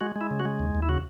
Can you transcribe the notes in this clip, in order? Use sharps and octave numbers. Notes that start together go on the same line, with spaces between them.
G#3 F#4
G#3
E4
C#3
F#4
G#3
D#2
D#2
E4
C#3 F#4